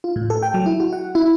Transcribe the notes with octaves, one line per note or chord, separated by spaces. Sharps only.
F4
A2
A4
G5
F#3
E4
F#4
F#5
E4